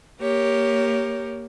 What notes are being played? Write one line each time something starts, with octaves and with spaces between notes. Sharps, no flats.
A#3 G4 A#4 C#5